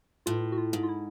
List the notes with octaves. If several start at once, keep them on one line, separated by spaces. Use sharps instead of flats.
A2 F4
F#4
F4
G#2
F4
E4